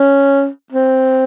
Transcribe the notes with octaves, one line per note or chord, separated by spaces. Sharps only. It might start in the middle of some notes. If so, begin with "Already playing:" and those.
Already playing: C#4
C4